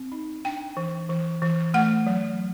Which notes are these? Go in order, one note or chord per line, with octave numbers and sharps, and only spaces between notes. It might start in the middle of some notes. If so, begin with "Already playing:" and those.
Already playing: C4
D#4
D4 G5
E3
E3
E3
A3 F#5
F#3